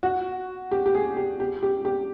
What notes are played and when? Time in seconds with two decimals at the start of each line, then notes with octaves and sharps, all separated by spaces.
0.03 F#4
0.71 G4
0.86 G4
0.95 G#4
1.17 G4
1.40 G4
1.63 G4
1.85 G4